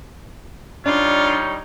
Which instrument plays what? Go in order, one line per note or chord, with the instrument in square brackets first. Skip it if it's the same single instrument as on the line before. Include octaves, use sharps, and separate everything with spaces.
[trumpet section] G3 D#4 C#5 [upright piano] D4 [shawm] F4